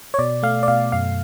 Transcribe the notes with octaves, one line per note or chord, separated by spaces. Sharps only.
C#5
B2 D5
A3 F5
D5
B2 F5
F#2 F5